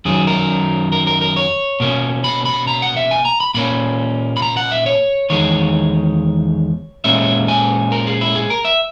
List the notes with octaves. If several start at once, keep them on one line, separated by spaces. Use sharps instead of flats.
F#2 D#3 F#3 G#4
A#4
A#4
A#4
A#4
C#5
B2 A#3 C#4
B5
B5
A#5
F#5
E5
G#5
A#5
B5
A#2 A#3 C#4 B5
B5
A#5
F#5
E5
C#5
E2 D#3 G#3 C#5
A#2 G#3 C#4 E5
G#5
A#4
G#4
E4
G#4
A#4
E5